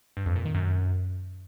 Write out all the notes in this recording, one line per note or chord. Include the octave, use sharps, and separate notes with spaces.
G2
F2
A#2
D#3
F#2